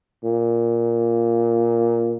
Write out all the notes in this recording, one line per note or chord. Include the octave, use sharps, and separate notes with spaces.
A#2